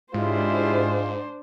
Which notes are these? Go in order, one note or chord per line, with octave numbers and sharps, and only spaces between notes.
G#2 C#3 G#3 D4 E4 F4 G4 C5